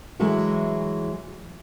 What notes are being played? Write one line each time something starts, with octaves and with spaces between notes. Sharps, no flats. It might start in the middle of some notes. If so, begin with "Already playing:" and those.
E3 F#3 G#3 A3 E4 F#4